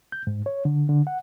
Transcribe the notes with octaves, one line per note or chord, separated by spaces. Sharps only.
G6
G#2
C#5
D3
D3
F#5